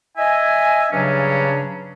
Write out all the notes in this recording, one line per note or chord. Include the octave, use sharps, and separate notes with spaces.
D#5 E5 G#5
G2 C#3 F#3 C#4 D4